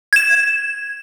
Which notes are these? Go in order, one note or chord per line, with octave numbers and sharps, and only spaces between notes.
G#6 E7